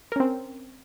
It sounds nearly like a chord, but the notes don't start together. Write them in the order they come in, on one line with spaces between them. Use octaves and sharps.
A#4 C#4 C4